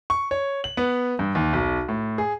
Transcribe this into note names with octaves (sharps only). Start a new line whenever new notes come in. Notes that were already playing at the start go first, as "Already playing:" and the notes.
C#6
C#5
F#7
B3
G2
D#2
B1
A2
G#4